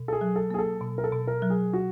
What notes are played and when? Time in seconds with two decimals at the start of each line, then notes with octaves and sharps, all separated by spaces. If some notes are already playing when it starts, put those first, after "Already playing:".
Already playing: B2
0.08 A4
0.13 G#4
0.21 F#3
0.36 A4
0.50 A#3 G#4
0.59 A4
0.81 B2
0.98 A#4
1.04 A4
1.12 B2
1.27 A#4
1.42 F#3
1.50 G#4
1.73 F#4